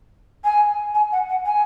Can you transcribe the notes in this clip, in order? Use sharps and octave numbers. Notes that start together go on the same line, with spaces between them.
G#5
G#5
F#5
F#5
G#5